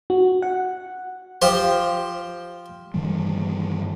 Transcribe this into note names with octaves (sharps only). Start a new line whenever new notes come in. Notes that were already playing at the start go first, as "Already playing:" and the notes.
F#4
F#5
F3 G4 C5
G2 D#3 E3 G3